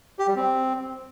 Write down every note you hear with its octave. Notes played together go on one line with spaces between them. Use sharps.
G4
G3
C4